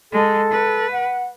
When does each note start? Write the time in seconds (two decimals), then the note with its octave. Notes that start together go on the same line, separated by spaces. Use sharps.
0.12 G#3 A4
0.51 B4
0.91 F#5